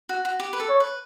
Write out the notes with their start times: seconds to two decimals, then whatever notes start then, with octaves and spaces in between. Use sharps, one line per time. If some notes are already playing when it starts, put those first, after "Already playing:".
0.09 F#4
0.25 F#4
0.40 G4
0.53 B4
0.60 A4
0.69 C#5
0.80 B4